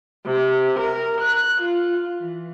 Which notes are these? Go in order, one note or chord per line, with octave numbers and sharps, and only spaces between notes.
C3
A#4
F#6
F4
E3